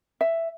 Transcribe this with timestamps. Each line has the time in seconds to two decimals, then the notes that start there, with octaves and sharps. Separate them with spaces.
0.21 E5